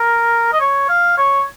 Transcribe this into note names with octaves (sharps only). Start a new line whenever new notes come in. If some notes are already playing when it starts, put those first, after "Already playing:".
Already playing: A#4
D#5
C#5
F5
C#5